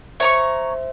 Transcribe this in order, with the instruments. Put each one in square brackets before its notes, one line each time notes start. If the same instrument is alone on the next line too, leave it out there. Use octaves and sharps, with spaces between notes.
[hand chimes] C5 E5 [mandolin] C#5 A#5 C#6